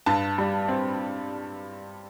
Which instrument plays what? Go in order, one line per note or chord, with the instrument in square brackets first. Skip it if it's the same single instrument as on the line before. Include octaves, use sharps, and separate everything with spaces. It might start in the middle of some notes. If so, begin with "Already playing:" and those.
[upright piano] G2 [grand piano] A5
[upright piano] G3
C4